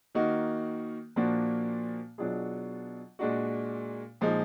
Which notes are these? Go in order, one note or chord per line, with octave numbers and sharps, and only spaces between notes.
D#3 A#3 D#4 F#4
A#2 F3 A#3 D4 F#4
B2 F#3 D4 F4 G#4
A#2 G#3 D4 F#4
A#2 F3 G#3 D#4